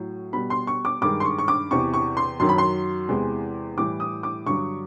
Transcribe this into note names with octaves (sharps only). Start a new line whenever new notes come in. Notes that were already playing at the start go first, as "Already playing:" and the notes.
Already playing: A2 F#3
B2 G3 B5
C6
C#6
D6
G2 D#3 G#3 D6
C6
C#6
C#6
D6
E2 C3 E3 C#6
C#6
C6
F#2 D#3 F#3 C6
B5
C6
E2 C3 E3 G#3
A2 E3 G3 D6
D#6
D6
G2 D3 F#3 C#6